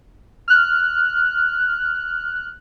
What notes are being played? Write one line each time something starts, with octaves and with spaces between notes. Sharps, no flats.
F6 F#6